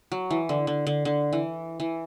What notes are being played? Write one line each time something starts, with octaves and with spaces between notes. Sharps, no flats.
F#3
E3
D3
D3
D3
D3
E3
E3